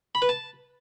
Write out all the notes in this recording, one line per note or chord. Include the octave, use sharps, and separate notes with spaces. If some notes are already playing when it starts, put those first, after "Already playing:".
B5
B4
A5